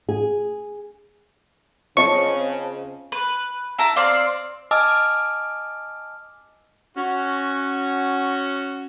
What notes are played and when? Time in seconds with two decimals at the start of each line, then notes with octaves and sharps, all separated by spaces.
0.09 G#4
1.97 C#3 C4 F4 C#5 D#5 A5 C#6
3.12 B4
3.79 E4 A5 A#5
3.96 C4 D5 F5
4.71 D#5 G#5 A5 D6 E6 F6
6.96 C#4 F#4